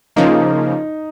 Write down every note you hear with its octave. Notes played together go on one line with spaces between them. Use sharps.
C#3 F3 A#3 D#4